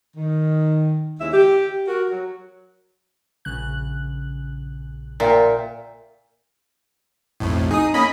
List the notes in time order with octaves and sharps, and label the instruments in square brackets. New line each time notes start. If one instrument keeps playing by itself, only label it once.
[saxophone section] D#3
D#2 C#3 G#3 E4 E5
G4
F#4 A#4
F#3
[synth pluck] A#1 C#3 F#6
[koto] A#2 [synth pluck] E5 F5 G5
[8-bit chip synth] B1 F2 A2
[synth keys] D#4 [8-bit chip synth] G#4 D#6
[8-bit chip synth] A#3 C#4 [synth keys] D#5 B5